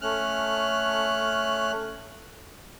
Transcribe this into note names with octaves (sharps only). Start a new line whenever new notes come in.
A3 C#4 F6 F#6